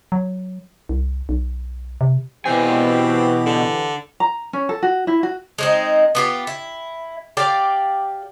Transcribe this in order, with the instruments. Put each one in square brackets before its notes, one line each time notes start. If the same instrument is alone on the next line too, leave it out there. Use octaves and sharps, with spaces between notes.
[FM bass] F#3
C2
B1
C3
[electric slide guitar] B2 G#5 [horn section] E3 G4 [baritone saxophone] C4
[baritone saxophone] D3
[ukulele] A#5
C#4
A4
F#4
E4
F#4
[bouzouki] G#3 C4 D#4
B3 F4 G4
E4
G4 D5 F5 G5